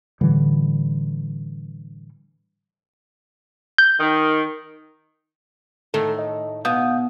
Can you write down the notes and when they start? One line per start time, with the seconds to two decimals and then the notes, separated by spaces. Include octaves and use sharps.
0.21 A2 D3 E3 G3
3.78 G6
4.00 D#3
5.94 A2 D#3 A3 A4
6.19 D#5
6.65 B2 F5 D#6 G6